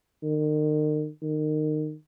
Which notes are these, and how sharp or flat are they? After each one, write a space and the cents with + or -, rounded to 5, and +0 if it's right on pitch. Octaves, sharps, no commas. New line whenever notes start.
D#3 -40
D#3 -25